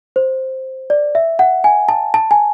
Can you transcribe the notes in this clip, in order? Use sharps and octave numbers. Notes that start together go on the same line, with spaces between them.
C5
D5
E5
F#5
G#5
A5
A5
G#5